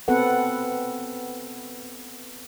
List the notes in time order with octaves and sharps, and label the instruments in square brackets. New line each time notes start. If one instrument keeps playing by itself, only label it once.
[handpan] B3 C4 A4 B4 F#5